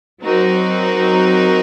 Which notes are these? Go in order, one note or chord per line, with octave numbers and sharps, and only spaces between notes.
F#3 C4 D#4 F#4 A#4